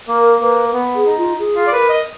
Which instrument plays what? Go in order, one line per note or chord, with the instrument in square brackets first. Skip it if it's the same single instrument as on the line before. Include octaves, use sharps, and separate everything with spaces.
[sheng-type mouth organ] A#3 [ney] A#4
[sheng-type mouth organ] A#3 [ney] B4
[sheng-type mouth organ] B3
[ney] G#4
[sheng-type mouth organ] D#4
[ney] F4
G#4
[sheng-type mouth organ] F4
D5
[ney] A#4 [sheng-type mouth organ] B4
[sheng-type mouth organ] D#5